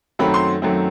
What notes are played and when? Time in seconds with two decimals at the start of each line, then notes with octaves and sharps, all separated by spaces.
0.19 F#2 D#3 F#3 A3 C4 B5
0.34 C6
0.62 F#2 D#3 F#3 A3 C4